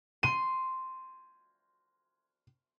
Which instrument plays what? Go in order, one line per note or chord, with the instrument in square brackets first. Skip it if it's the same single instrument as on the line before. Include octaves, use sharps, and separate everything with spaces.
[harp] C6 [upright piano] D#7